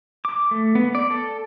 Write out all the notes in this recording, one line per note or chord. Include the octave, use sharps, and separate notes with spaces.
D6
A3
B3
D5
A4